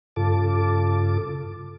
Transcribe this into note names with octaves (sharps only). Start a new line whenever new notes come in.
G2 C#3 F4 A4 A5 D6